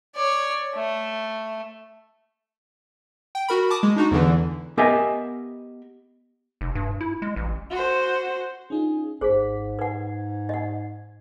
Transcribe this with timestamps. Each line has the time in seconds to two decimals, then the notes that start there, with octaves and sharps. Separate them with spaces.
0.15 C#5 D5
0.75 A3
3.35 G5
3.48 F#4 A#4 B5
3.70 A5 D6 D#6
3.83 G#3
3.96 D4 D#4 F#4
4.11 E2 D3 E3
4.77 B3 G4 A#4 D#5 E5 G#5
6.61 F1
6.75 G2
7.01 E4
7.22 G#3
7.36 A1
7.70 F#4 C5
8.70 C#4 D#4 F4 G#4
9.21 G#1 G#2 G#4 C5 B6
9.79 B4 F#5 G#6
10.49 D#5 F#5